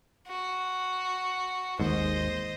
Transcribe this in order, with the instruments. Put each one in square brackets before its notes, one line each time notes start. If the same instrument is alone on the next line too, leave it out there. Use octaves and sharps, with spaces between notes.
[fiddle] F#4
[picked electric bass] G#1 D#2 G#2 [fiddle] C5 D#5